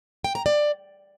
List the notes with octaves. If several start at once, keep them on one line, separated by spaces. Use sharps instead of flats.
G5
A#5
D5